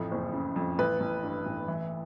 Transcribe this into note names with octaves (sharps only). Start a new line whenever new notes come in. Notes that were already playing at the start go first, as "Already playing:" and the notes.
Already playing: A1 F2 A2
F#1
C#3
F2
A1 B4
A1
G2
A1
E3